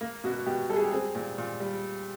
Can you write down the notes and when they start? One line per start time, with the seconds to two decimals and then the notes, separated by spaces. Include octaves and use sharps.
0.01 A#3
0.24 B2 F#4
0.46 B2 G4
0.69 G3 A4
0.76 G#4
0.84 G4
0.91 C4 G#4
1.15 A#2
1.38 A#2
1.60 G3